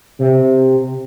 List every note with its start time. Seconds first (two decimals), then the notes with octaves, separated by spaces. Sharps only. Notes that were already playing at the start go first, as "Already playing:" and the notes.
0.19 C3